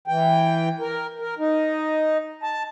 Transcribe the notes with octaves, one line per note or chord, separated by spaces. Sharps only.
E3 G5
A#4
A#4
D#4
A5